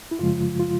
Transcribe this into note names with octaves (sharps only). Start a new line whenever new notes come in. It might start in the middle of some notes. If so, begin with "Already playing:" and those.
E4
F#2 C#3 F3 G#3 F4
F4